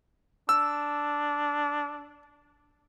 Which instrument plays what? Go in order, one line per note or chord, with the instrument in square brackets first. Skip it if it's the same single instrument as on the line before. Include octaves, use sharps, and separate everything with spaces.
[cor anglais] D4 [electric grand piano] E6